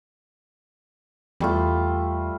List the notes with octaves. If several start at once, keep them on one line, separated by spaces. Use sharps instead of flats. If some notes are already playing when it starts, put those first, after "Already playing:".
E2 G3 A3 F4